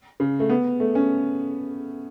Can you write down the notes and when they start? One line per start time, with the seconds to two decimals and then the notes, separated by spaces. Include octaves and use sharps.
0.20 C#3
0.39 A3
0.50 B3
0.80 A3
0.95 C#4